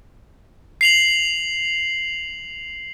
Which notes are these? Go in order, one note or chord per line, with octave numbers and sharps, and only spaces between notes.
C7 F7 F#7